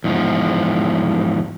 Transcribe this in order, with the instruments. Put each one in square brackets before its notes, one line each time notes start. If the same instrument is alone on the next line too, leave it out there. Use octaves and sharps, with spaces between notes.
[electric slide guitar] E2 G#2 F3